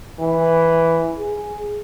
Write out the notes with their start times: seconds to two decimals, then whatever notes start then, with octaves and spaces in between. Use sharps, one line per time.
0.21 E3
1.18 G#4